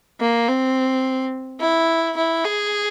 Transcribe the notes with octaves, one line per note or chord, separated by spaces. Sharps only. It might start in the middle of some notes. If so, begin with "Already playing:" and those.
A#3
C4
E4
E4
G#4